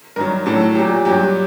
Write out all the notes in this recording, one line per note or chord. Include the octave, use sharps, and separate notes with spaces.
G2 D#3 F#3 A#4
A2 F#3 A4
A#2 F#3 G4
G2 F#3 G4